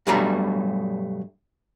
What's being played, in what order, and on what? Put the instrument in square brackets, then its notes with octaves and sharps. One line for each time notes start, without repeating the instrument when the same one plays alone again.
[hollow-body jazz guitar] G2 B2 F#3 G3 A3 A#5